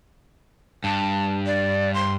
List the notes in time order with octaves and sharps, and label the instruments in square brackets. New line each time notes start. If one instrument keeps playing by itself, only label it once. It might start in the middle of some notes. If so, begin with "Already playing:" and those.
[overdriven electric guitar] G2 [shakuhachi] A5
[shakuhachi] D5
C6